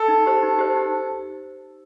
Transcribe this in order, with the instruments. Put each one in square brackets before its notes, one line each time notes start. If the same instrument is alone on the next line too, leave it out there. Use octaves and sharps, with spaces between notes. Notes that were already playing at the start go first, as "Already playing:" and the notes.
Already playing: [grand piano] A4
[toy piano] D#4
G4 C5
D#4
G4 C5
D#4